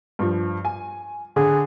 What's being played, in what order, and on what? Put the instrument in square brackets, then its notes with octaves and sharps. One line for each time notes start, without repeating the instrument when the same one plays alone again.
[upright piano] G2 F3
G#5
[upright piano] D3 [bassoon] G#4